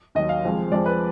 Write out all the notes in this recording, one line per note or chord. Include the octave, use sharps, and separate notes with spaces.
D#2 D#3 F#3 D#5
F5
F1 F2 F3 G#3
F2 F3 G#3 D5
B4